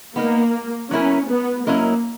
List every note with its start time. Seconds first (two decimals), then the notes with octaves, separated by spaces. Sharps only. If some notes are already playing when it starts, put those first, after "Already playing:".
0.16 A#3 B3 D#4 A#4
0.91 F#3 B3 C#4 E4 A#4
1.29 B3
1.66 F#3 A#3 C#4 E4 A#4 D#5